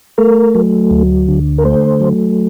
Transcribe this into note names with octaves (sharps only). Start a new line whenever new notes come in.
A3 A#4
F#3
D2
D3
A#4
A3 C5
F#3